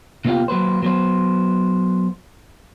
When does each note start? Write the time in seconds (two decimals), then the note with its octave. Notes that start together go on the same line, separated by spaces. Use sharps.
0.25 C3 A#3 B3 D#4 F4 G4
0.48 F#3 A#3 B4 C5
0.82 F#3 B3 C5